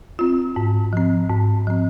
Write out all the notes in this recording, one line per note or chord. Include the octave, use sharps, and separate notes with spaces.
C4 F4
G#2
F3 C4
G#2
F3 C4